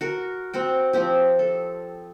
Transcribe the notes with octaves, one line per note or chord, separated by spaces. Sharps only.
F#4 A#4
C4 F#4 G5
F3 C4 G4
A4